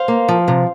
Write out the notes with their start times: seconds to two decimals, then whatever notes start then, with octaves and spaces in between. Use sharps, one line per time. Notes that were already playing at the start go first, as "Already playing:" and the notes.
Already playing: C5 F5
0.08 A#3
0.29 F3
0.48 C3